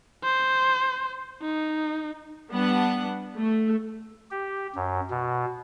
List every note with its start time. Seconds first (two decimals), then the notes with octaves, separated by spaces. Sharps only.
0.24 C5
1.42 D#4
2.50 G3 B3 D4 F#5
3.36 A3
4.31 G4
4.75 F#2
5.10 B2